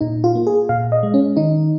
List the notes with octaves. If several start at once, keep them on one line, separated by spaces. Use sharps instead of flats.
A#2 D#4
F4
A#3
G#4
A#2 F5
D#5
G#3
C#4
D#3 D#4